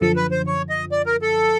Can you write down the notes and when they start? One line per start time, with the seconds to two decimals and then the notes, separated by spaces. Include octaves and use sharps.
0.01 F#2 D3 F3 A4
0.16 B4
0.31 C5
0.46 C#5
0.69 D#5
0.92 D5
1.06 A#4
1.22 A4